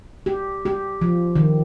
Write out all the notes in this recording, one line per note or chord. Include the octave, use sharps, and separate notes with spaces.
G4
G4
F3
D#3